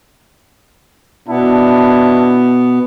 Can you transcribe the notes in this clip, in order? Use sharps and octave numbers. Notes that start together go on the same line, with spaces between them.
B2 B3 D4 E4 A5